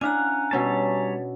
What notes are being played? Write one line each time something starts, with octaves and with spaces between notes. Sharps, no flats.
C#4 D4 E4 F5 F#5 G#5 A#5
B2 G3 C#4 C#5 A5 E6